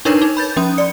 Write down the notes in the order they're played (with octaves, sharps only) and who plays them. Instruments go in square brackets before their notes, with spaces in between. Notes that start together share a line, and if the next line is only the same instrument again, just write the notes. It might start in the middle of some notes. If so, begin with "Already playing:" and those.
[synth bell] D4 D#4 A#4 B4 C#5
D#4
B5 G6 A6
F3 C#4 D#6
D5 C#7